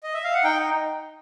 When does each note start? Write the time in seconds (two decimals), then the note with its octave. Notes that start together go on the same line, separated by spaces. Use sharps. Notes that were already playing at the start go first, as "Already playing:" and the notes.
0.03 D#5
0.14 E5
0.24 F5
0.34 F#5
0.44 D#4 G5